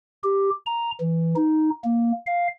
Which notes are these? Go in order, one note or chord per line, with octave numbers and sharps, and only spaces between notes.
G4
A#5
E3
D#4
A#3
F5